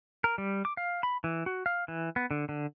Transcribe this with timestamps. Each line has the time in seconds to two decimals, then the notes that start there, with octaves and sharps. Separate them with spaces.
0.24 A#4
0.38 G3
0.65 D6
0.77 F5
1.03 B5
1.24 E3
1.46 F#4
1.66 F5
1.88 E3
2.16 B3
2.31 D3
2.49 D3